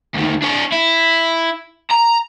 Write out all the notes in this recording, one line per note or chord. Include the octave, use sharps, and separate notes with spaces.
D2 D#3
D4 C#5
E4
A#5